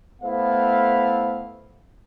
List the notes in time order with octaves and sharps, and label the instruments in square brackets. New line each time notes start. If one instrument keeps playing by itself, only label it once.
[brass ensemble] A3 B3 E4 C5 F5